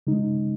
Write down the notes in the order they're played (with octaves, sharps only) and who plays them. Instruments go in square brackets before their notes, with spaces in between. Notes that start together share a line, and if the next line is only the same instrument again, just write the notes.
[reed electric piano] C#3 G#3 D#4